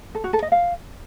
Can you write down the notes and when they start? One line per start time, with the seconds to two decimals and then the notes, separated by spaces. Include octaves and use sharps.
0.15 A4
0.24 F#4
0.33 A4
0.42 D#5
0.52 F5